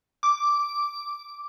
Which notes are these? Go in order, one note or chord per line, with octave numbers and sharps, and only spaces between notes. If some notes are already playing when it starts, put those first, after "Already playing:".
D6